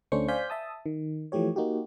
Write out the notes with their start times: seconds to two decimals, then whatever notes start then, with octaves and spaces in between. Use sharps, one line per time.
0.12 D2 A3 C#4 D4 C5 C#6
0.28 C5 D5 F5 G#5 G6 B6
0.50 E5 A5 D#6
0.86 D#3
1.32 E3 F3 A3 G4 C#5
1.56 A#3 D#4 F#4 G4